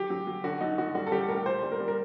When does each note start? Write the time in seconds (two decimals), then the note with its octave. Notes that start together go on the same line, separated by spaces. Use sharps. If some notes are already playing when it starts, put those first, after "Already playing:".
Already playing: F#3 G4
0.10 F#3
0.27 F#3
0.44 D3 F#4
0.60 F#3 D#4
0.78 F#3 F#4
0.95 G3 F#4
1.07 A4
1.12 G3 G4
1.29 A2 A#4
1.46 A#2 C5
1.63 G3
1.72 A#4
1.80 G3
1.88 A#4